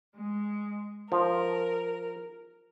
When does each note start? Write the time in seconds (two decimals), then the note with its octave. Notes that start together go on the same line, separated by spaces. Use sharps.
0.15 G#3
1.12 F3 A#4